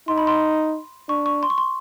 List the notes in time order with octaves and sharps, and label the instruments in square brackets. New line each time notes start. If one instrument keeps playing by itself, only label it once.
[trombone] D#4 [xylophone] C6
[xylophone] B5
C6
[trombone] D4 [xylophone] C#6
[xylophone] C#6
C6
C#6
C6